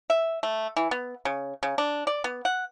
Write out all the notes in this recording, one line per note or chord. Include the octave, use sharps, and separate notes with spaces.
E5
A3
E3
B3
C#3
C#3
D4
D5
B3
F#5